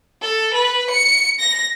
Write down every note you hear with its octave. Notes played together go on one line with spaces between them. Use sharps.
A4
B4
C#7
A#6